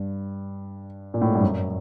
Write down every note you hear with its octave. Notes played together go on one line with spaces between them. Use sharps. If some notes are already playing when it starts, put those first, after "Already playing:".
Already playing: G2
A#2
A2
G#2
G2
F#2